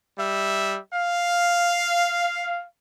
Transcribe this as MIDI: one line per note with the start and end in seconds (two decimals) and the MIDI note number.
0.17 0.80 55
0.17 0.80 76
0.94 2.63 77